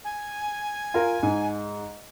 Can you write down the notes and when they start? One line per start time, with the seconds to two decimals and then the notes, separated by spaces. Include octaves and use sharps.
0.05 G#5
0.94 F4 A#4
1.23 G#2